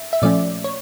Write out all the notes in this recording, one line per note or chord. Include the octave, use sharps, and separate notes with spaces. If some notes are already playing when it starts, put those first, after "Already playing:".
Already playing: E5
E5
A#2 F3 A3 C#4 D5
C#5